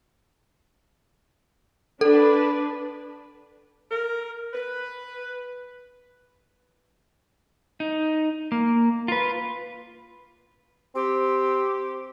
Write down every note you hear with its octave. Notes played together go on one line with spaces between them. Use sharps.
D4 A4 B4
A#4
B4
D#4
A#3
F4 B4
C4 G4